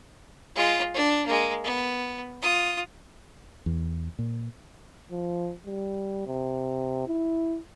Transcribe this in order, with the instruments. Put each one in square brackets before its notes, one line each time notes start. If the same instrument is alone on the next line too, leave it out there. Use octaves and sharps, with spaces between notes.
[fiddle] G#3 F4
D4
G#3 A#3
B3
F4 D#6
[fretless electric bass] E2
A#2
[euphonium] F3
G3
C3
E4